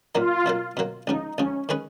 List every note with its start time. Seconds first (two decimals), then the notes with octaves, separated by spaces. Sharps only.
0.15 A#2 F#3 A#3 D#4 F4
0.46 B2 F#3 A#3
0.77 B2 F#3 A#3
1.07 C#2 C#3 F3 D#4
1.38 C#2 C#3 F3 C#4
1.69 D#3 G#3 C#4 G#4 B4